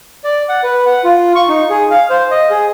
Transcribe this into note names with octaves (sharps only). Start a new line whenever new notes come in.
D5
F#5
B4
F#5
F4
C#6
D#4
G#4
F5
C5
D#5
G#4